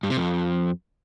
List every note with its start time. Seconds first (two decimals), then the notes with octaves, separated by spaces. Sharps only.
0.03 G2
0.10 C3
0.17 F2